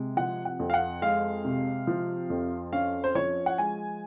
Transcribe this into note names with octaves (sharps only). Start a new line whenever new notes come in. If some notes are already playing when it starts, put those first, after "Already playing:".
Already playing: C3 G#3
F3 F#5
F#5
F2
F5
F#5
G#3 F5
C3
F3
F2
C#4 F5
C5
F3 C#5
F#5
G#3 G#5